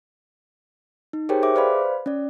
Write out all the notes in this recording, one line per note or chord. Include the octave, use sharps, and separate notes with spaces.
D#4
G4 G#4 A#4 C5 C#5 G5
G#4 C5 E5 D6
B4 C5 D5 F5 B5
C#4 D5